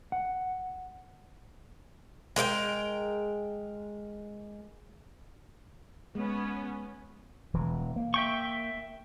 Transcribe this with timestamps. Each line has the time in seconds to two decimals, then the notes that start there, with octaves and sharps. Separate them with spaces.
0.12 F#5
2.36 G#3 A#4 D#5 G5
6.15 G#3 B3 C#4
7.54 E1 E3
7.96 A#3
8.14 E5 G5 C#6